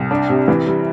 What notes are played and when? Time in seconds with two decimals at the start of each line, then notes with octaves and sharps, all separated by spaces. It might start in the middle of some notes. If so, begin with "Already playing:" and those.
Already playing: C2
0.11 D4
0.29 C3
0.48 E3
0.67 G3